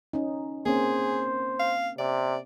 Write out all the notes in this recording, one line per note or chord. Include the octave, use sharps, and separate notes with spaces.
C#4 D#4
A#3 C4 C#4 G#4 C5
F5
C3 D5